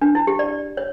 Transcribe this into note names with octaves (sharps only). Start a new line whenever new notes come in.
D4
E4
G4
D5
C#5